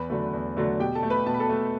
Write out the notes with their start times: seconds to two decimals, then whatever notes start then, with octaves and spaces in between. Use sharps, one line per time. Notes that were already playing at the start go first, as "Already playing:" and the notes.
Already playing: E2 B4 B5
0.10 D3 F#3 A3
0.33 E2
0.57 D3 F#3 A3
0.79 B2 G4 G5
0.95 A4 A5
1.03 A3
1.10 B4 B5
1.26 B2 A5
1.34 B5
1.40 A4 A5
1.49 A3